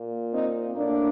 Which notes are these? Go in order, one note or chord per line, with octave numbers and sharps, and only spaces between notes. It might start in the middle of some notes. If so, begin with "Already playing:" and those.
Already playing: A#2
C4 D#4
A2 A#3 D4